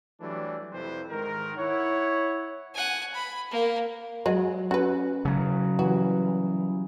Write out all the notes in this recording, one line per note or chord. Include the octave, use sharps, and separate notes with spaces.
E3 F#3 G3 A3 D4
F2 C3 C4 E4 B4 C5
G#2 D#3 A#4
E4 C#5 F#5
F#5 G#5
B5
A#3
F#3 G#3 F#4 D#5
C#4 F#4 B4
C#3 F#3
E3 G3 F#4